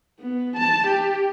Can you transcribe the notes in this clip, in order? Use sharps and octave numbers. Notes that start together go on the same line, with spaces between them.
B3
A5
G4